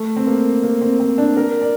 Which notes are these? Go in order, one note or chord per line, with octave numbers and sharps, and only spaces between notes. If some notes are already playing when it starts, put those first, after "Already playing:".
Already playing: A3
C4
A#3
A#3
C4
C4
D4
A#4
D5